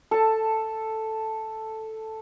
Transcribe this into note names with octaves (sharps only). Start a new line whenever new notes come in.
A4 A5